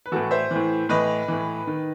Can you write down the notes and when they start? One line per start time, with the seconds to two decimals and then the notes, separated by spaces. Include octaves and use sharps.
0.06 B4
0.12 A2 E3 F#4 A4
0.31 C5 E5
0.51 A2 E3
0.89 A2 E3 B4 D#5
1.28 A2 E3
1.67 D#3